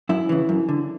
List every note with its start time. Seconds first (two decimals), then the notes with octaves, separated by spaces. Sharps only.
0.09 F#2 E4
0.29 C#3 E3
0.49 F#2
0.69 D3